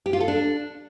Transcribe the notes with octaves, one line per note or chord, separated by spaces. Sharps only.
G4
F4
A4
D4